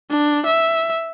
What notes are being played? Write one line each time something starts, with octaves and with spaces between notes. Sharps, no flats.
D4
E5